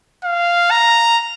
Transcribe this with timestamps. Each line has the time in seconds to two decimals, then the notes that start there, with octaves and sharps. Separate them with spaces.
0.24 F5
0.71 A#5